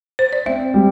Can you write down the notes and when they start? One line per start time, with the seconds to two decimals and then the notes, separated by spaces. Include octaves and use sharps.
0.19 C5
0.33 D5
0.46 C4 E5
0.74 G3